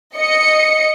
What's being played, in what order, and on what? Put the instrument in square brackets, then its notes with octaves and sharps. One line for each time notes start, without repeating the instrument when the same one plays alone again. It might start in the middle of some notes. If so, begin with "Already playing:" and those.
[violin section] D#5 C#7